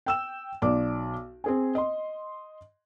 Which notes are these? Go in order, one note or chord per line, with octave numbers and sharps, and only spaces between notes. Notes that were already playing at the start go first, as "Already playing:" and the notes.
G5 E6 E7
B1 D5 D6
C4 G#4 G#5
D#5 C6